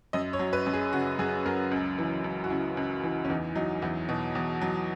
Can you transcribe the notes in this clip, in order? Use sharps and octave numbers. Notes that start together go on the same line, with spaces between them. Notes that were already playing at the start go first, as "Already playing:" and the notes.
F#2 D#5
C#5
F#3
B4
F#2
G#4
C#3 F#4
F#2 G#4
F#3 A#4
C#2
E3
C#2
F#4
C#3 E4
C#2
E3
C#4
E2 D#4
F#3 D#4
E2 E4
B2
E2
F#3